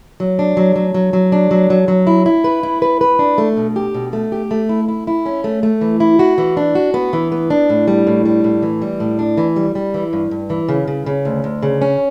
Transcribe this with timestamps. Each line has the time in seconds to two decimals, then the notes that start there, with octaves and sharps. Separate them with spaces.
0.20 F#3
0.39 D4
0.57 F#3
0.76 F#3
0.94 F#3
1.13 F#3
1.32 D4
1.51 F#3
1.70 F#3
1.88 F#3
2.07 E4
2.26 E4
2.44 B4
2.63 E4
2.82 B4
3.01 B4
3.19 D4
3.38 A3
3.57 B2
3.76 G4
3.94 B2
4.13 A3
4.32 G4
4.51 A3
4.69 E4
4.88 E4
5.07 E4
5.26 C#4
5.44 A3
5.63 A3
5.81 E3
6.00 E4
6.19 F#4
6.38 E3
6.57 D4
6.75 F#4
6.94 B3
7.13 E3
7.32 B3
7.50 D4
7.69 A2
7.88 G3
8.07 A2
8.26 G3
8.44 A2
8.62 E3
8.82 G3
9.00 A2
9.19 D4
9.38 E3
9.56 G3
9.75 G3
9.94 E3
10.13 G2
10.31 G2
10.50 E3
10.68 C#3
10.88 C#3
11.06 C#3
11.25 D2
11.44 D2
11.63 C#3
11.82 C#4